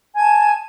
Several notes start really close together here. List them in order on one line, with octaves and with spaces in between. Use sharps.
G#5 G#6 A5